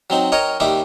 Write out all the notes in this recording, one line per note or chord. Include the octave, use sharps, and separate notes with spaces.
F#3 C4 D#4
A#4 C#5 D#5 G5 A#5
D#2 G3 D#4 E5 D6